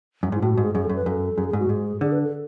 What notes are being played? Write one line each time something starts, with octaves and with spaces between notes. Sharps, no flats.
F#2
G#2 E4
A2 F#4
G#2 F#4
G#4
F#2 G#4
A4
F#2
B4
F#2 A4
F#2 G#4
G#4
G#2
F#4
G#2 G#4
D3 G#4
B4
A4